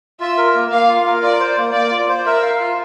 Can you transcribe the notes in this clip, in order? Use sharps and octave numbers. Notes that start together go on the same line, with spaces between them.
F4 E5
A#4
A#3
A#3 F5
F4
A#4
F4 D5
C5
A#3
A#3 D5
F4
C5
A#4 E5
F5
F4